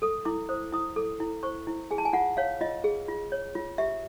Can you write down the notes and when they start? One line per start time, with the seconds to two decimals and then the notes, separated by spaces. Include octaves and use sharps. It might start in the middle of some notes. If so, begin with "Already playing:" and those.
0.02 A4 D#6
0.25 E4 D6
0.49 C5 D#6
0.72 E4 D#6
0.96 A4 D6
1.20 E4
1.43 C5 C#6
1.67 E4
1.91 G#4 G#5
1.98 A5
2.05 G#5
2.13 F4 F#5
2.37 C#5 F5
2.61 F4 D#5
2.84 G#4
3.08 F4
3.32 C#5
3.55 F4
3.78 G4 E5